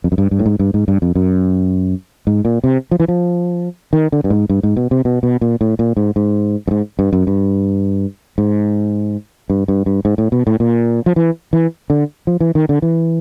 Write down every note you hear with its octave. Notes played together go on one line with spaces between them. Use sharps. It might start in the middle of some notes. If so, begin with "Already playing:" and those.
F2
F#2
G2
G2
A2
G#2
G2
G#2
G2
F2
F#2
G#2
A#2
C3
F3
E3
F3
D#3
D3
G2
G#2
G2
G#2
B2
C3
B2
B2
A#2
A2
A#2
G#2
G#2
G2
G#2
G2
F#2
G2
G#2
G2
G2
G2
G#2
A2
B2
A2
A#2
F3
E3
E3
D3
F3
E3
D#3
D3
E3